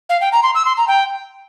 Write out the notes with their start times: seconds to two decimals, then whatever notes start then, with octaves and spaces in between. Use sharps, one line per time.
0.09 F5
0.21 G5
0.32 A#5
0.43 C6
0.55 E6
0.65 C6
0.77 A#5
0.88 G5